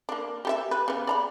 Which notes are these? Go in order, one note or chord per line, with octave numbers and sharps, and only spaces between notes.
A#3 D4
G4 A4 E5
B4
C#3 B3
D5 A#5 B5